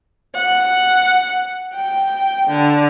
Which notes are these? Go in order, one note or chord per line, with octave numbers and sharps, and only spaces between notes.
F#5
G5
D3